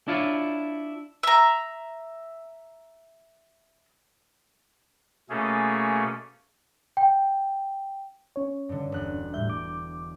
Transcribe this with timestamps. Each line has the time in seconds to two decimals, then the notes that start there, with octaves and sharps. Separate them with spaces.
0.08 D4 E4 F4 C#5
1.23 E5 A#5
5.30 B2 A3 A#3 C#4 G#4 A4
6.97 G5
8.36 C#4 C#5
8.69 G2 D3
8.92 E1 F#6
9.34 A2 G3 E5 G6
9.50 D6